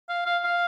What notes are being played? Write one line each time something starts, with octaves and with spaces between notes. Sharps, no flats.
F5
F5
F5